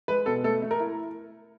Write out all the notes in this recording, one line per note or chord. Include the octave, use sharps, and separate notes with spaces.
G#3 B4
B2 A4
A3 A4
A3
A#4
E4